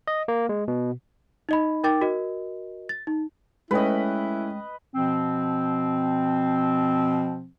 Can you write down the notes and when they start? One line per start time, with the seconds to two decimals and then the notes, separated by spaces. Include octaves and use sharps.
0.07 D#5
0.28 A#3
0.49 G#3
0.68 B2
1.49 D#4 D#5 B5
1.84 D#4 A#4 G5 D6 G6 A6
2.01 F#4 A#4 D#5
2.89 A6
3.07 D#4
3.71 G#3 A3 C#4 E4 B4 D#5 G5
4.95 B2 F3 C4